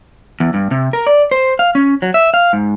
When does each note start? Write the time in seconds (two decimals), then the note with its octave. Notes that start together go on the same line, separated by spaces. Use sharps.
0.40 E2
0.54 G2
0.71 C3
0.93 A#4
1.07 D5
1.31 C5
1.59 F5
1.75 C#4
2.02 F#3
2.14 E5
2.34 F5
2.53 G#2